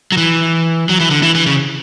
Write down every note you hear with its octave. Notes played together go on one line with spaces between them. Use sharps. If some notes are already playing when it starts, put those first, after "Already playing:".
F#3
E3
F#3
E3
D3
E3
E3
C#3